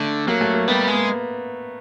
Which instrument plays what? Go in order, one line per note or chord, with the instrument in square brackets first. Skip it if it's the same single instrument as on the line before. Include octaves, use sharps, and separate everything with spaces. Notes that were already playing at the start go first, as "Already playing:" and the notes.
Already playing: [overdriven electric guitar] D3 [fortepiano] A3
[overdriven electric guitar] F#3 [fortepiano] A#3
[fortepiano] A3
A#3
[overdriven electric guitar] G3 [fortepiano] B3
[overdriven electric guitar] G#3
[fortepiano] A#3